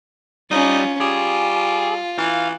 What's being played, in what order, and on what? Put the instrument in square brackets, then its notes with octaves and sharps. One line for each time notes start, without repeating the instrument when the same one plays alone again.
[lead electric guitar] G3 [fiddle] C#4 F4 [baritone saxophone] D#4
[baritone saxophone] G3 [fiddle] F4 [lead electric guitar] G#4
[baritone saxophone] E3 [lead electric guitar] F5